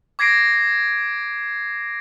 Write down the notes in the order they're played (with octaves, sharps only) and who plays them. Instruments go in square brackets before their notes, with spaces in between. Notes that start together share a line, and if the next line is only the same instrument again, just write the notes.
[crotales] D6 G#6 A#6 C7 D7